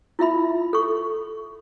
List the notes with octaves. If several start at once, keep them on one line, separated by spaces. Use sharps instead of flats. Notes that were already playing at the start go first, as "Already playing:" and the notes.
E4 F4 E5 B5
A4 C#6